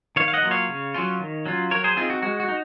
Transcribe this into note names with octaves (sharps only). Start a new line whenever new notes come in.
D#3 C#5 F5
F5
D#5 F#5
F#3 A#3 F4
C#5 F5
C#3
F#3 C#4 F4
D#3
F#3 C#4 F4
F#3 A#4 C#5
G#4 C5
C4 D#4 F4 G#4
F#4
G#3 F#4
F#4
D#4